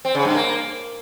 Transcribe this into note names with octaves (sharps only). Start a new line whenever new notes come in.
C4
C#3
G2
A#3